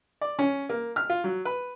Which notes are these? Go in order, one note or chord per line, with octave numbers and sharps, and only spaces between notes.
D5
C#4
A#3
F6
F4
F#3
B4